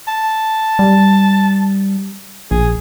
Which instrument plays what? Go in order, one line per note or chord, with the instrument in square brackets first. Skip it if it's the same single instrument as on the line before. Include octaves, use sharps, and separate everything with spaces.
[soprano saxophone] A5
[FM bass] G3
[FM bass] A#1 [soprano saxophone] G#4